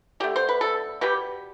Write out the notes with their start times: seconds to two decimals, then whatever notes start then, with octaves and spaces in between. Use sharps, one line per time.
0.20 D3 A3 G4
0.36 C5
0.49 B4
0.61 A4
1.01 B2 G3 B3 G4